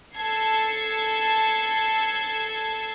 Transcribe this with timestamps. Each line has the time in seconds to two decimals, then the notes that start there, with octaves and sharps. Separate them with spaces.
0.15 A4 A5 E6 G#6 C7 C#7